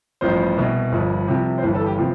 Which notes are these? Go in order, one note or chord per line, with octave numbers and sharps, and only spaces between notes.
A1 G2 F3 C5
C2 B2
G1 G2 F3
C2 C3 F3
C5
G1 G2 E3 B4
A4
G4
C3 F3 F4